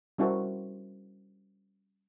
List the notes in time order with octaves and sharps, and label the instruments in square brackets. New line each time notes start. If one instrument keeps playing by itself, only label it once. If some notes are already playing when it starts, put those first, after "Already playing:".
[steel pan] G3 C#4 E4 F#4 A#4 C5